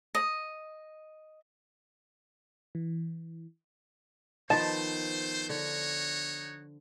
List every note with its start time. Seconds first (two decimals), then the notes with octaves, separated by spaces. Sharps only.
0.15 D#5
2.75 E3
4.50 D#3 F3 A3 B3 C5 A5
5.49 D3 D#4 F#4 C#5